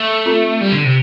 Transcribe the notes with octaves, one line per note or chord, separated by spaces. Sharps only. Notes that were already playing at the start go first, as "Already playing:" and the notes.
Already playing: A3
C4 F4 A4
G3
D3
C3